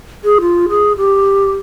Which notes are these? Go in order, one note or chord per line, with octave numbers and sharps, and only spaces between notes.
G#4
F4
G#4
G4